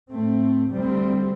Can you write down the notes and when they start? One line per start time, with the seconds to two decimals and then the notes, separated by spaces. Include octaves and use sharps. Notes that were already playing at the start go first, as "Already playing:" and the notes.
0.11 A2 A3 C4
0.69 D2 C3 G3 C4